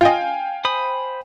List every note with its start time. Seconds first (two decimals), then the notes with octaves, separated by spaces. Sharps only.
0.01 F4 D#5 F5 G5 G#5
0.65 C5 B5 D#6